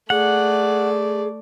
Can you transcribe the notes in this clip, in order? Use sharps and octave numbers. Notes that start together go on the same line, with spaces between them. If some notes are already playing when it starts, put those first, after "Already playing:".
A3 G#4 D5 F#5